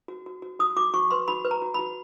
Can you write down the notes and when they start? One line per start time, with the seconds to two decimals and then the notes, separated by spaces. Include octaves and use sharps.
0.08 F#4
0.26 F#4
0.42 F#4
0.59 F#4 D#6
0.77 F#4 D6
0.94 F#4 C#6
1.11 B4 C6
1.28 F#4 B5
1.45 B4
1.51 A#5
1.62 F#4
1.74 F#4 B5